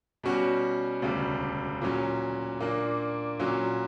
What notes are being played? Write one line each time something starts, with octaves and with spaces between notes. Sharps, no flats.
B2 G3 C#4 F#4
E1 D2 C#3 G3
A#2 F#3 C#4
A#2 A#3 D4
A#2 F#3 C#4